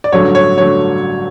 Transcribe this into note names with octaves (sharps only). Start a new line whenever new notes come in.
D5
A1 G2 D3 F#3 A3 C#5
C#5
D3 F#3 A3 C#5